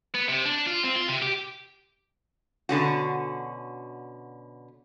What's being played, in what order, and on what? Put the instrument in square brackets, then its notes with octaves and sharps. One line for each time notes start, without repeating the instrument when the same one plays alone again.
[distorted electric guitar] B3
C3
D4
F4
C4
F4
C3
G4
[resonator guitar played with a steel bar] B2 D3 C#4 F#4